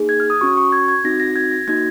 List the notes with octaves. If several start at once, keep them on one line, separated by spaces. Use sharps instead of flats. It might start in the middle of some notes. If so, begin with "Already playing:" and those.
Already playing: A#3 D#4 G#4
G#6
F6
D#6
C#4 F#4 C#6
C#6
G#6
G#6
C4 D#4 F#4 A#6
A#6
G#6
A#6
A#3 D#4 F#4 G#6